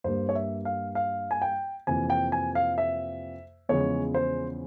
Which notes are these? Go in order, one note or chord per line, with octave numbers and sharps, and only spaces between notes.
G2 G3 A#3 C5
C#5
E5
F5
F5
G#5
G5
F2 C3 E3 A#3 G#5
G5
G#5
F5
E5
E2 C#3 F3 G#3 C#5
C5